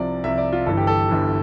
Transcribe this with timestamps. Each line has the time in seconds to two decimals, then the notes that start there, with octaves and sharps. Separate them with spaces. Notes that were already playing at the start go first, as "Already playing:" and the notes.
Already playing: C2 C3 F3 D5
0.24 C2 C3 F3 E5
0.38 D5
0.53 F4
0.66 G1 G2 E3 A4
0.77 G4
0.87 A4
1.09 G1 G2 E3